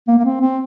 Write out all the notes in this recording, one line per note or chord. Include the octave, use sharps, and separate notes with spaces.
A#3
A#3
C4
C4